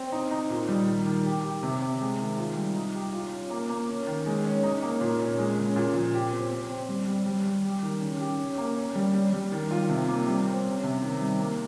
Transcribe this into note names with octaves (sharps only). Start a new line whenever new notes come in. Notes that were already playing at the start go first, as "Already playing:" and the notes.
Already playing: C4
D#4
D#4
A#2
G3
D#3
D#3
G4
G4
C3
C3
G#3
D#3
F4
G3
D#4
G4
F4
C#4
A#3
A#3
C#4
D#3
G#3
C#4
D#4
A#3
A#2
C#4
G#3
C#3
A#2
F3
G4
C4
C4
C4
G3
G3
G3
G3
G4
D#3
C#3
G4
C#4
A#3
C#4
G3
G3
G3
D#3
F4
C3
A#3
G3
C4
C#4
C3
D#3
G3
A#3